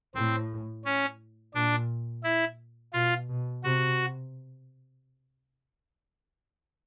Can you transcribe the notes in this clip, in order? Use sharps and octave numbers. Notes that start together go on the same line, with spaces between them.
A2 C4
C#4
A#2 D4
E4
B2 F4
B2
C3 F#4